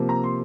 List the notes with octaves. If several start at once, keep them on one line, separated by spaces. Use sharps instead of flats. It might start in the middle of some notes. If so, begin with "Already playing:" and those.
Already playing: C3 F3 A#3
A#5
C6